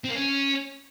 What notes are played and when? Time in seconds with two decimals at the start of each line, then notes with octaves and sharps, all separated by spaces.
0.04 C4
0.10 A#3
0.15 C#4